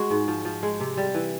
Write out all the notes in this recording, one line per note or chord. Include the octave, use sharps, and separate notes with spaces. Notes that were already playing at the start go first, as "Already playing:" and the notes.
Already playing: G#3 F#4 G#4
G#2
F3
F3
G#3
C3
G3
E3